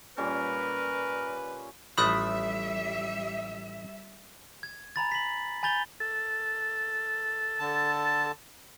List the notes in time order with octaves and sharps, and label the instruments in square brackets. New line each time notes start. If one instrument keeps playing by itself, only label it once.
[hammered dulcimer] A#2 G3 C#4 [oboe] A#4 [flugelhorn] B4
[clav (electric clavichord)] A1 F3 A3 [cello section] G3 E5 [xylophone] B5 D#6 F#6
[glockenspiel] G#6
G#5 A#5 B5 A6
B6 F#7
G#5 B5 G6 A6 F7 G7
[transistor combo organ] A4
[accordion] D3 A5